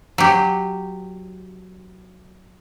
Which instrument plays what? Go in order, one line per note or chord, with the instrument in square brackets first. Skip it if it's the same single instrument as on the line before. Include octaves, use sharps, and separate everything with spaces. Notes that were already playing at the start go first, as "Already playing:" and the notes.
[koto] F#3 G4